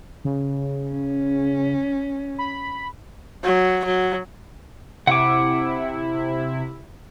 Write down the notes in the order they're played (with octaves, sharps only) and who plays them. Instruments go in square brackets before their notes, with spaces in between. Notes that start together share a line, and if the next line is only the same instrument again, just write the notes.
[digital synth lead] C#3
[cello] C#4
[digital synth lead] B5
[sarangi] F#3
F#3
[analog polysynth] C3 E4 [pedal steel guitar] F#5 D6